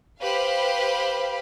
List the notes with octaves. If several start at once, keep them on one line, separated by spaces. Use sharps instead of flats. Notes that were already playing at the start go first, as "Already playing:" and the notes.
G4 B4 C5 F5 B5